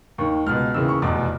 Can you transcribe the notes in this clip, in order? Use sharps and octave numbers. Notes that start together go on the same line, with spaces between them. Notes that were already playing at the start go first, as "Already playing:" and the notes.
D#2 D#3 C#6
C#2 B2 F6
D#2 C#3 E3 E6
C#6
F1 E2 B2 D6